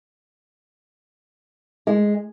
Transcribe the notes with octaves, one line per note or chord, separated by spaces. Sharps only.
G#3